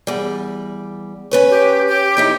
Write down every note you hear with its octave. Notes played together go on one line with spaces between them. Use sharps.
E2 G3
C#4 B4 C#5
G4
G4
F2 D#4 E4